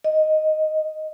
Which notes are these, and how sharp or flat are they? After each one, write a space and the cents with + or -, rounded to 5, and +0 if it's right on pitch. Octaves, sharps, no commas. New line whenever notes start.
D#5 +0